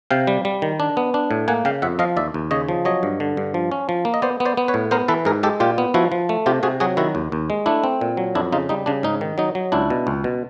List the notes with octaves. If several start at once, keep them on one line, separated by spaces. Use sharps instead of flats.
C3 F5 G5
G3
G3
D#3
D4
B3
D4
A2
A#3 F#5 G#5
C#3 F5 G5
F2 E5 F#5
F3 D#5 F5
D#2 D5 E5
D#2
C#3 C#5 D#5
F3
F#3 C#5 D#5
G2
D3
G2
F3
C#4
F3
A#3
D#5
B3 C5 D5
B3
C5 D5
B3
B4 C#5
A2
B3 A#4 C5
E3 A4 B4
G#2 G#4 A#4
G#3 G4 A4
A#2 F4 G4
B3
F3 E4 F#4
F3
A3
C3 F4 G4
C3 F#4 G#4
F#3 F#4 G#4
D#3 E4 F#4
D#2
D#2
G#3
A3 D4 E4
C4
A#2
F#3
F2 D4 E4
C#3 D#4 F4
G3 D#4
C#3 D4
G#2 D#4
D#3
F#3 D#4
F#3
C#2 D4 E4
B2
C#2
B2